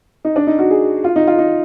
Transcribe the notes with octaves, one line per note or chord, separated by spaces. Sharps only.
D#4
D4
D#4
F#4
G#4
F4
D#4
F4
D#4